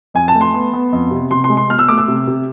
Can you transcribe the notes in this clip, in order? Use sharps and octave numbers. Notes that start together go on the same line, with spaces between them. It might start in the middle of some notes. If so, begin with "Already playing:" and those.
F2 G#5
A5
A3
C6
B3
B3
F2
C3
C3 C6
C6
G#3
C6
B2 F6
E6
A3 D6
E6
C3
C3